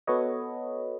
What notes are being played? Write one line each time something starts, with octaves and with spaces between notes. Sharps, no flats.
B3 F#4 A4 B4 C#5 D#5